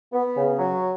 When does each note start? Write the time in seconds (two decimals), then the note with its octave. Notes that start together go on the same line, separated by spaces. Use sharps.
0.12 B3
0.35 C#3
0.59 F#3